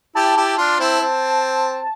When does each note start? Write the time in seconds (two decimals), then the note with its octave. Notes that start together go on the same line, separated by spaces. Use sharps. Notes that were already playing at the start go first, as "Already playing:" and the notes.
0.15 E4 G4 A5
0.36 E4 G4
0.58 D4 F4
0.79 C4 E4
1.01 C4